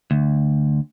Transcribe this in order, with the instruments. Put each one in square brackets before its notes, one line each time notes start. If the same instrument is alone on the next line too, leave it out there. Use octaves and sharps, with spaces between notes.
[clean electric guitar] D2